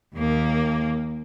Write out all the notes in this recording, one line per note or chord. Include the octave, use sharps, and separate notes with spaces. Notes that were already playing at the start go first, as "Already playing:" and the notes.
D#2 A#3